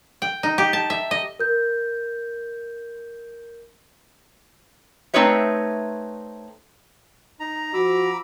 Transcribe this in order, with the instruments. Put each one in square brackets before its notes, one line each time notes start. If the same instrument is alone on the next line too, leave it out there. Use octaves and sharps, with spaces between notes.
[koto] G5
D#4
G4
A5
E5
D#5
[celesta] A#4 G6
[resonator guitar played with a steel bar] A3 C4 D#4 B4 C#5 E5
[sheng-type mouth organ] D#4 [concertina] A#5
[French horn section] F3 F#4 [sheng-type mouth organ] B5 D6 E6